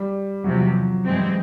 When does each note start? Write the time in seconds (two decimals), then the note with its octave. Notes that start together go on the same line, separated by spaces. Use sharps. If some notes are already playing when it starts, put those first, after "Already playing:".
Already playing: G3
0.44 E2 C3 F3 F#3
0.59 F#3
1.05 G2 E3 G#3 C4